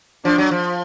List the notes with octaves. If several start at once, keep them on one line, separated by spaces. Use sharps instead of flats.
F3 D4
F#3
F3